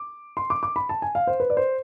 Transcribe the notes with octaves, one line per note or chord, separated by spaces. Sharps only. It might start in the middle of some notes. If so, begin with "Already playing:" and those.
Already playing: D6
C6
D6
D6
B5
A5
G#5
F5
C5
B4
D5
C5